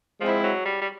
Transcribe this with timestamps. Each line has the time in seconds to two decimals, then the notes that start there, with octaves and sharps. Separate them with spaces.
0.20 F3 G#3 C4 E4
0.44 F#3
0.66 G3
0.81 G3